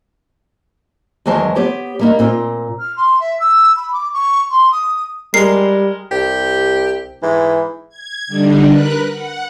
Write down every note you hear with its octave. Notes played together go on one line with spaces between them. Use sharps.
E2 D#3 F#3 G#3 C5 A5
B3 G4 C5 C#5
G3 A#3 D#4
A#2 C4 F4
F6
C6
E5
E6
B5
D6
C#6
C6
D#6
G3 G#3 A#4 C7
C2 G4
G#2 E3
G#6
D3 G3 D4 D#4
A#4 B4 F#6
F#5